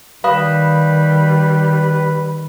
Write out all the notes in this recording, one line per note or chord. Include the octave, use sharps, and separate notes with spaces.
D#3 G3 B4 F5 B5 D#6